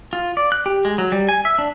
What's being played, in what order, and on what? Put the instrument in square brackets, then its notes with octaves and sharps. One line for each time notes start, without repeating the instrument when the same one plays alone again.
[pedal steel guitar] F4
D5
F#6
G4
G#3
F#3
G3
G#5
E5
D4